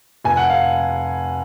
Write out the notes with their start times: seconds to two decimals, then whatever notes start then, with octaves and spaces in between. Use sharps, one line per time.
0.24 F1 G#5
0.37 F#5
0.50 F5